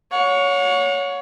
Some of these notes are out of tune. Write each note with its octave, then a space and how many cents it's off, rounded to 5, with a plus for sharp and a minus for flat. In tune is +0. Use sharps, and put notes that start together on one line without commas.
C#5 +15 F#5 -40